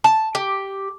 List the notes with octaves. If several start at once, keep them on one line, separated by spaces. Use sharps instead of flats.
A5
G4